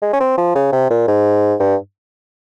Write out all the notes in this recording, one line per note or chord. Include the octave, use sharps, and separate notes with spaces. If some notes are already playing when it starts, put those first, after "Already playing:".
G#3
C#4
C4
F3
C#3
C3
A#2
G#2
G2